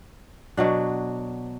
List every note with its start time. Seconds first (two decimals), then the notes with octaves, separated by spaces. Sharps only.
0.57 B2 F#3 D4